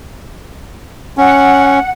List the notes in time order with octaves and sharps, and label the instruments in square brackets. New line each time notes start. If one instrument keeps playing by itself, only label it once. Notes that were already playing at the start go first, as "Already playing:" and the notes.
[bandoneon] C#4 [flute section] F#5